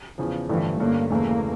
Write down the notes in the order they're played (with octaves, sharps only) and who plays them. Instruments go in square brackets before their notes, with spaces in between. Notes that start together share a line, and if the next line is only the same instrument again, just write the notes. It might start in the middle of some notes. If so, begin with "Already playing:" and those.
[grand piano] E2 C#3 F3
[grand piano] A1 G2 D3 F3 A3 [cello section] E3
[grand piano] G2 D3 A3 C#4 [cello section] A#3
[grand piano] E1 E2 C#3 E3 A3 [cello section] A#3